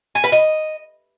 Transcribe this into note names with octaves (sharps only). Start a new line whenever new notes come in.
G#5
B4
D#5